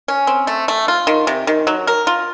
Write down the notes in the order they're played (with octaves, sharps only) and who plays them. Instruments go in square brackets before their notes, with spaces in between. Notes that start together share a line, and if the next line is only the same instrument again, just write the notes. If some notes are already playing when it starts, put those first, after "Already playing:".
[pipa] C#4
C4
A3
A3
F4
D#3
C3
D#3
F#3
A#4
F4